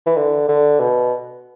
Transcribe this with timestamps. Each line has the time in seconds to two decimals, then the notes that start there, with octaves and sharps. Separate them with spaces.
0.06 E3
0.17 D3
0.49 D3
0.80 B2